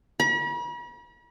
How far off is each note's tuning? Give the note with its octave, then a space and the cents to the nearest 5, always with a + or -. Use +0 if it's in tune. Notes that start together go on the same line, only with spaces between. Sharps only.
B5 -45